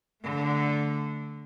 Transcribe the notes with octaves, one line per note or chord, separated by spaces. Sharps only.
D3 A3